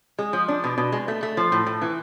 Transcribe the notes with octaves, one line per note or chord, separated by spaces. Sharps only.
G#3
F3
D4
B2
B2
G#3
A3
A3
F3
A2
A2
E3